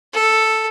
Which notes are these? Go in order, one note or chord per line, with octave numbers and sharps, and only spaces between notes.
A4